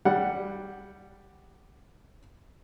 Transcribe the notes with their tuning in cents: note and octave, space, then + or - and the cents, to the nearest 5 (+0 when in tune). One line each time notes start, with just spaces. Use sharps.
G3 +0 F#5 +0